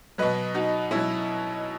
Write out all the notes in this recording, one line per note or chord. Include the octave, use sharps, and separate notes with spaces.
B2 F#3 B4 D#5
D#4 F#4
B2 F#3 C#4 E4